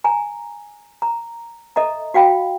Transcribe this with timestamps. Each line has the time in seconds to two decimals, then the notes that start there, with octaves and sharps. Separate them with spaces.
0.04 G#5 A#5
1.02 A#5
1.76 A4 D#5 E5 A#5
2.14 F#4 F5 G5 B5